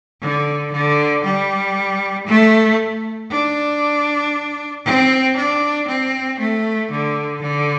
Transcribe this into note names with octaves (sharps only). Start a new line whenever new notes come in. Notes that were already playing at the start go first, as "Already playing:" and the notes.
D3
D3
G3
A3
D4
C4
D4
C4
A3
D3
D3